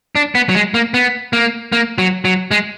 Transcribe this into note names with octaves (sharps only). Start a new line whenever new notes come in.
D4
B3
F#3
G#3
A#3
B3
A#3
A#3
F#3
F#3
G#3